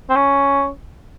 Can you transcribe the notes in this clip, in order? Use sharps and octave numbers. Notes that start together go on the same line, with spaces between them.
C4
C#4